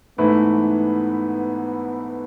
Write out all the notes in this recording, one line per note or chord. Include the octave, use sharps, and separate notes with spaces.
G#2 E3 A3 B3 E4 B4